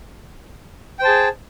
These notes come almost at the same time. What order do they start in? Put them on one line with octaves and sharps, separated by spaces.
G5 C5 A5 G#4